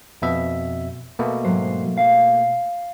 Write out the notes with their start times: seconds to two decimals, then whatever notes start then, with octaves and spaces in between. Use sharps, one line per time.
0.22 F2 B2 E5
1.19 B2 A3 A#3
1.45 G#2 F#3 C5
1.98 F5